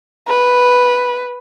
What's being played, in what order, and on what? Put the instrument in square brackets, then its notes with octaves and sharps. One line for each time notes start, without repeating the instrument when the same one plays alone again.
[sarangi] B4